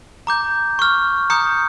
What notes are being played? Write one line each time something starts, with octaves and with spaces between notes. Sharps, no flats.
A#5 D6 G6
C#6 F6
A#5 D#6 G6 C#7